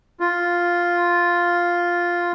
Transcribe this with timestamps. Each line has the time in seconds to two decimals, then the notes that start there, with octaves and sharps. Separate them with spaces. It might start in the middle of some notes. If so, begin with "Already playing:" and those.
0.20 F4